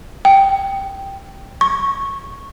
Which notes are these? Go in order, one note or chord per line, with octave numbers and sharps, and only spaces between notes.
G5
C#6